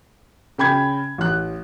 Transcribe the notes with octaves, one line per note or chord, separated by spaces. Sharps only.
C#3 G5 B5 G#6
A1 F#6